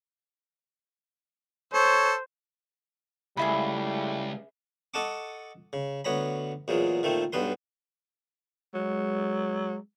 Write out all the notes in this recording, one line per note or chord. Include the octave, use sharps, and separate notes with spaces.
A4 C5 C#5
C#2 G3 A3 E4 G#4 E5 B5
A4 D#5 F#5 A5 C#6 D6
C#3
D2 B3 C#5 A#5 B5
E2 A#2 F#3 G#3
A#2 D#3 A3 C4
B1 G2 B3 B4 C6
F#3 G#3